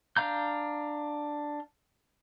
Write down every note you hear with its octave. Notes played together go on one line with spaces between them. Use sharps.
D4 F5 A#5 G6